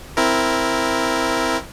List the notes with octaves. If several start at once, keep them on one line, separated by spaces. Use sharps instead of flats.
C4 E4 A#4